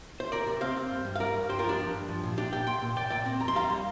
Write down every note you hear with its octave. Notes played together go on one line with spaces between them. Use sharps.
C5
C3 A#4 D5
C3
C4 C5 F5
C4
G2
G3
F5
G2 A#4 D5
G2
G2 G4 C5
F4 A#4
F3
D4 G4
G2
G2
F3
A#2
A#2 D4 G4
A#2 D5 G5
A#3 G5 C6
A#2
A#2 D5 G5
A#2 D5 G5
C4
F2 A#5
C6
G3 F5 A#5
G3